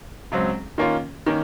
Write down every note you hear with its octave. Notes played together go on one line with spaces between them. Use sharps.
C#2 C#3 F#3 C4
D#3 A#3 C#4 F4
D#3 A#3 C#4